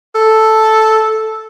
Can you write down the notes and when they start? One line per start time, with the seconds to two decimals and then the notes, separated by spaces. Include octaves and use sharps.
0.15 A4